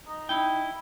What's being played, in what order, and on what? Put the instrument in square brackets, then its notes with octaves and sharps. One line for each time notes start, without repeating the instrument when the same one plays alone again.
[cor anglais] D#4
[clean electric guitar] D#4 G5 [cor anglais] E4